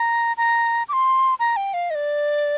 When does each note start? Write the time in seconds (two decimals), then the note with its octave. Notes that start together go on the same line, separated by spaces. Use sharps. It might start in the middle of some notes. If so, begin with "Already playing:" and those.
Already playing: A#5
0.37 A#5
0.89 D6
0.93 C6
1.39 A#5
1.57 G5
1.74 F5
1.90 D#5
1.95 D5